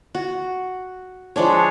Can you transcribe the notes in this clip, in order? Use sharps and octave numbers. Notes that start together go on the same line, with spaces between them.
F#4
F3 G#3 D4 C#5